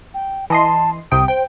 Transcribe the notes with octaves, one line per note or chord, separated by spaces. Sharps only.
G5
E3 D#5 A5 C6
C2 C3 G5 D#6
C5 G5 G6